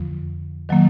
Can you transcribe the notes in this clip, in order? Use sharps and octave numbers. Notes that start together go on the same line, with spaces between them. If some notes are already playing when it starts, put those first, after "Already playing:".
Already playing: F2 D3 F3
D#3 F#3 A#3